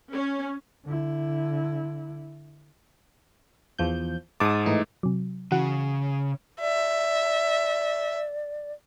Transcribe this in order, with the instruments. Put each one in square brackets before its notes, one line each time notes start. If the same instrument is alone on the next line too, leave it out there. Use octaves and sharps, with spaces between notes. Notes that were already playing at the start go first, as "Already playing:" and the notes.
[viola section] C#4
[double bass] D3 E4
[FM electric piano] E2 F3 G6
[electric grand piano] G#2 D6 [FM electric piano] A5 D#6
[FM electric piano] A2 E3 D#4
[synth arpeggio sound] C3 F#3
[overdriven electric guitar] C#3 [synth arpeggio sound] E3 F#4 F#5
[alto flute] D5 [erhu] E5